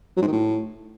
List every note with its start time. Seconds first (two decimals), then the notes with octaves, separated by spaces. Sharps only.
0.16 F#3
0.22 G#2
0.27 D#3
0.32 A2